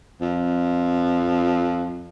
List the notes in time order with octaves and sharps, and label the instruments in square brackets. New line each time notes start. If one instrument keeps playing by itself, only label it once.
[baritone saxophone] F2